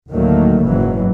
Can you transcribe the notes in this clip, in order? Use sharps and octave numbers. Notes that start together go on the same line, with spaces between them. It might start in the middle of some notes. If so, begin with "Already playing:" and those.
D2 A2 D#3 F#3 A3 A#3
F#1 G#2 B2 E3 F#3